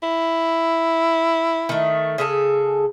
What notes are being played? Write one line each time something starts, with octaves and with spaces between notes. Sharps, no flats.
E4
D#3 A3
C#3 G#4 A4